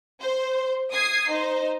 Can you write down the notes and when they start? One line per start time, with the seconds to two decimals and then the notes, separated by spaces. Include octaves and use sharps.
0.22 C5
0.93 D#6 G#6 C7
1.30 D#4 C5